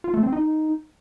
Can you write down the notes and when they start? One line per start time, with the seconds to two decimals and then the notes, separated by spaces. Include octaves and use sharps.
0.04 F4
0.14 A3
0.23 C4
0.33 D#4